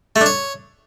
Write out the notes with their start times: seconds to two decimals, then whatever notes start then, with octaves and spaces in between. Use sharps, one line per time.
0.16 A3
0.21 D4
0.26 C#5